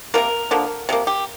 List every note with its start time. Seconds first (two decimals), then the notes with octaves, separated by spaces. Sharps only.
0.14 F3 A#3 A#4
0.18 C3
0.51 D3 F3 A#3
0.89 C3 F3 A#3
1.07 G4